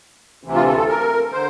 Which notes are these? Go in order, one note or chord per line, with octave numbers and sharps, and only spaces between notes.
D2 C3 E3
F4
A4
A4
A#4
D3 C5